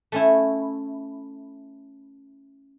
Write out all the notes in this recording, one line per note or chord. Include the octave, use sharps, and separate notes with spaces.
A3 C#4 E4